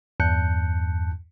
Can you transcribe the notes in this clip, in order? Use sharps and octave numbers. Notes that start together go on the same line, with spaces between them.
E2 G2 A5 F#6 G6 C#7